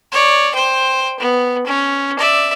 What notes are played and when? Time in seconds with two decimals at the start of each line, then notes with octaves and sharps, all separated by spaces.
0.12 C#5 D5
0.55 C5 G5
1.20 B3
1.66 C#4
2.19 D5 E5